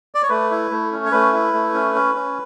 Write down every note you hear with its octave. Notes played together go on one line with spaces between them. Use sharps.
D5
C#5
A3 B4
E4
A3
C#4
C#5
A3 B4
E4
A3
C#4
C#4
C#4